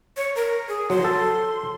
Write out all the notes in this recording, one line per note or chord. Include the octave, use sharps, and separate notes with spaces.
C#5
A#4
G#4
F#3 C6
A4